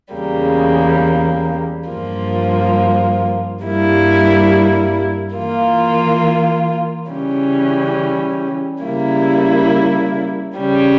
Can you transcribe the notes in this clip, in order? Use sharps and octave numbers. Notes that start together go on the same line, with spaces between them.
E2 C#3 G3 A#3
G2 F3 A#3 F4
G2 G3 A#3 E4
E3 A#3 F4
C#3 E3 G3 C#4
C#3 G3 A#3 E4
C#3 G3 C#4